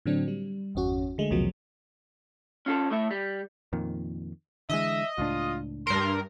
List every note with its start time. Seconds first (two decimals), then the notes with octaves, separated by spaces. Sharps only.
0.06 A2 D3 F#3 C4 D4
0.28 G3
0.75 G1 E2 C#4 F#4
1.18 D3 G#3 A3
1.30 B1 E2 C3 F3 F#3 A#3
2.66 C#4 F4 G#4 A4
2.90 A2 A3 E5
3.11 G3
3.73 F2 A#2 D#3
4.70 D3 E3 G#3 D#5 E5
5.18 C#2 A2 D4 F4
5.87 G2 A#4 C6